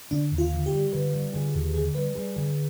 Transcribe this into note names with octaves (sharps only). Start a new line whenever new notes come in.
D3 D4
D#2
F4
D3
G4
G3
D3 B4
G3
D3 G#4
D#2
D3 G#4
G3 B4
G3 G#4
D3 G#4